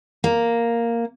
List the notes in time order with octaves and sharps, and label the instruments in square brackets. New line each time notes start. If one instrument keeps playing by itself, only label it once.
[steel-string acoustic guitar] A#3